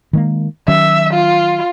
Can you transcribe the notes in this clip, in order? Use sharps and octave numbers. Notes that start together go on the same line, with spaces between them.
D#3 G#3 A#3
D#3 F#3 C#4 E5
F4